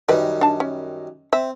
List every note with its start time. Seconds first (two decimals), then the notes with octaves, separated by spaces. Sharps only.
0.09 F#2 D#3 G3 A#4 B4
0.41 D4 A5
0.60 C#4
1.33 C4 E5